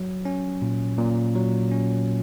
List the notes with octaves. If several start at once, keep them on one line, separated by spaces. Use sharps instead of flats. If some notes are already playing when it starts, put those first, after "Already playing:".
Already playing: F#3
C#4
A#2
A#2
F#3
C#4